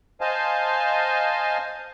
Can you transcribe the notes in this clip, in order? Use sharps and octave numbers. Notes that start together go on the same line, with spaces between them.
C5 D#5 F5 G#5 A5